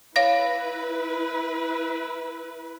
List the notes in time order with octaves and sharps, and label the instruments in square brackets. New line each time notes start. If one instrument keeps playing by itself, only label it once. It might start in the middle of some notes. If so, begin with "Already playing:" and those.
[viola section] E4 B4 [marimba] C#5 F5 A#6